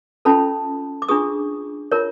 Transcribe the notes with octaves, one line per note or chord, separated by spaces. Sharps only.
C#4 F4 A4 A5 B5
D6
D4 F4 G#4 C#6 D#6
F4 A#4 C#5